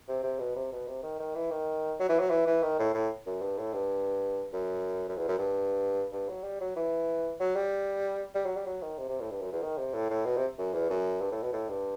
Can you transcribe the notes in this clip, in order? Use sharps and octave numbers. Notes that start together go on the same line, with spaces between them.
C3
C3
B2
C3
B2
C3
D#3
D#3
E3
D#3
F#3
E3
F#3
E3
E3
D#3
A2
A2
F#2
G2
A2
G2
F#2
F#2
E2
F#2
G2
G2
F#3
G3
F#3
E3
F#3
G3
G3
F#3
G3
F#3
D#3
C3
C3
A2
G2
F#2
E2
D#3
C3
A2
A2
B2
C3
F#2
E2
F#2
G2
A2
B2
A2
G2